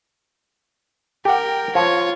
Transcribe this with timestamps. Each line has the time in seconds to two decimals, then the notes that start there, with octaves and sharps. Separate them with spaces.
1.25 G4 A#4 F#5 G5
1.75 F3 F4 C#5